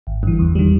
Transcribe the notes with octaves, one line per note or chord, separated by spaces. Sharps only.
G#1
G2 E3
E2
D#3 G3